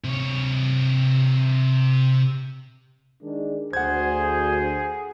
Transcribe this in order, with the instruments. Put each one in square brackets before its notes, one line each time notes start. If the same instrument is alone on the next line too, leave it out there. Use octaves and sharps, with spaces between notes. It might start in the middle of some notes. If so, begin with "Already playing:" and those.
[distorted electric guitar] C3 C#5
[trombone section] D#3 G#3 D4
[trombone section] D2 [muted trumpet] G#4 [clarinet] C5 [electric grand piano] F#5 G#6